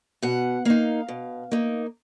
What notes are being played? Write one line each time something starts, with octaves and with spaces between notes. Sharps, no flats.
B2 F#5
A#3 D#4 F5
B2
A#3 D#4